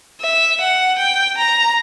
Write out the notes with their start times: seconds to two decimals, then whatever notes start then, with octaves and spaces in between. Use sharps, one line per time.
0.21 E5
0.60 F#5
0.98 G5
1.37 A#5